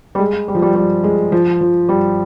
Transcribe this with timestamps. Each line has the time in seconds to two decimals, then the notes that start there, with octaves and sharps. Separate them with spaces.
0.15 G3
0.19 G#3
0.48 G3
0.55 F3
0.62 G3
0.75 G3
1.04 G#3
1.32 F3
1.61 F3
1.89 G3